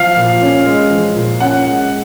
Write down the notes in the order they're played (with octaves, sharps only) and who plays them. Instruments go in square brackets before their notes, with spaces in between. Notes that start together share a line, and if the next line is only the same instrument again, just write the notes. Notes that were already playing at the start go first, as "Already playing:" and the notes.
Already playing: [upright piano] F3 [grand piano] F5
[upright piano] A#2
C#4
G#3
F3
A#2
[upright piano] C#4 [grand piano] F#5
[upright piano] G#3